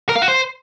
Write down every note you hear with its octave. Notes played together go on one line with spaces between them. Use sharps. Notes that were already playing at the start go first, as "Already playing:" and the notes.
A#4
F5
F#4
C5